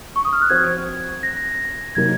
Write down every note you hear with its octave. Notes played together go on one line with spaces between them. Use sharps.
C#6
D#6
F6
F#6
F3 C4 F#4 C5 G#6
A#6
C3 F#3 A#3 D#4 G#6